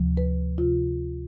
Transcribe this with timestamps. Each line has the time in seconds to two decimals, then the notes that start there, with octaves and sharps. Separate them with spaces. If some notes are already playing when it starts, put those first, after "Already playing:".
Already playing: D2 C3 F3
0.17 B4
0.58 C3 F3 F4